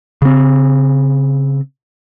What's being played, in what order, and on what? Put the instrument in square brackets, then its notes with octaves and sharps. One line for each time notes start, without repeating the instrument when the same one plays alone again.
[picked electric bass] C#3 C4